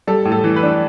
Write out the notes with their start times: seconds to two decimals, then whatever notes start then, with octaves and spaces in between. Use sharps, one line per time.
0.07 G3 A4
0.25 A2
0.32 A4
0.44 E3
0.56 B4
0.63 D4